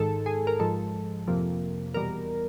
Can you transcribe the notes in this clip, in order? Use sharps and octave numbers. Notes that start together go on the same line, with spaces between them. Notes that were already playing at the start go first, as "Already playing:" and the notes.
Already playing: G#2 D#3 G#3 A4
G#4
A#4
G#2 F3 G#3 A4
F2 C3 F3 A#3
E2 B2 G3 A#4